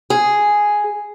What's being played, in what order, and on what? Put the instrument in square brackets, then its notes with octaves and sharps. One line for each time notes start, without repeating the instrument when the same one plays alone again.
[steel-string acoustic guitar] G#4